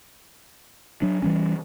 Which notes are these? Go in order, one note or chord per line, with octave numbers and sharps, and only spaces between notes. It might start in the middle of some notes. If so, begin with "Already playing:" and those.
F#3 D4
E3 G3 C#4